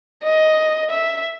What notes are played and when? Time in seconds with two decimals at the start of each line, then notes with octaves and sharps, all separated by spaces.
0.23 D#5
0.90 E5